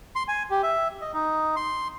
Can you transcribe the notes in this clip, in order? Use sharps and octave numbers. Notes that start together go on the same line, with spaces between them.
C6
G#5
G4
E5
D#5
D#4
C6